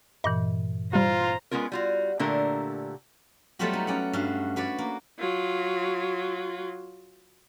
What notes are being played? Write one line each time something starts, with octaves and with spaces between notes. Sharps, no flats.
G2 A#2 E3 D#5
C3 G3 F4 C5 A#5
G#3 B3 C#4 F4 A#4
G3 F4 F#4
A#2 D3 A3 D4 G4 A#4
F#3 G3 A3 B3 F4 F#4
D#4
C#4 D5 F#5
G2 F#4 F5
F#4 B4 C#5 D5
A#3
F#3 F4